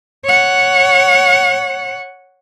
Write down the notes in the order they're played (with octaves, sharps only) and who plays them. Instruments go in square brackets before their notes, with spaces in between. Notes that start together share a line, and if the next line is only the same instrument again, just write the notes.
[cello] C#5 F#5